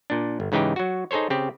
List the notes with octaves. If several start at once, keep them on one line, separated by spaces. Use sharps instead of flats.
A#2 D4
G1
G#2 C#3 E3 D#4 G4
F#3 F#4
D#4 G#4 A4 C5 C#5
C#3 C4 G4